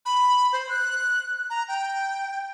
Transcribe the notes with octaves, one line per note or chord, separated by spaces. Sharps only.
B5
C5
F#6
A#5
G5